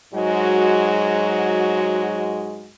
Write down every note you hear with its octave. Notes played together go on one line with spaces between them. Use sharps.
G#2 F#3 G#3 F#4